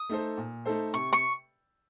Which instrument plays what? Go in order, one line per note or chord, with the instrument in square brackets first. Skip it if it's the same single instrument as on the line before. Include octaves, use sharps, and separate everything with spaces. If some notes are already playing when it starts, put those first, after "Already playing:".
Already playing: [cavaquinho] D#6
[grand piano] A3 D#4 A4 C5
A#2
A3 D#4 A4 C5
[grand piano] C3 [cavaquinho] C#6
[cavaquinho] C#6